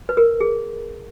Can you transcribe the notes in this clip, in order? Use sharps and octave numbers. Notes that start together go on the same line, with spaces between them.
B4
A#4
G#4